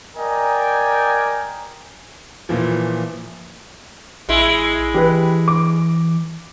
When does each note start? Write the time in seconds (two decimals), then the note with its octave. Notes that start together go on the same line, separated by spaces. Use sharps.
0.17 A#4 D5 D#5 G5 G#5 A#5
2.49 A#2 E3 F3
4.29 A1 G#3 E4
4.94 E3 G4 B4
5.48 D6